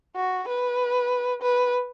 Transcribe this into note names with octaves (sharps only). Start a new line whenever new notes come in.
F#4
B4
B4